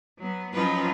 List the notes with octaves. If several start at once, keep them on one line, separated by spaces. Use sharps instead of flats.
F#3 B3
F3 F#3 C#4 D#4 F4 B4